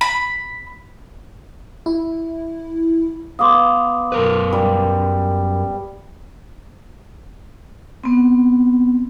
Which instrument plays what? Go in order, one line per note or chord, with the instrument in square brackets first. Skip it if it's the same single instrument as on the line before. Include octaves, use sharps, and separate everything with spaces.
[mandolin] B5
[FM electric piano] E4
[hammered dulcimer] B3 F5 [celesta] C6 D6 D#6
[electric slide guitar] F#2 A#4 B4
[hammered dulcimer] G3
[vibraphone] B3 C4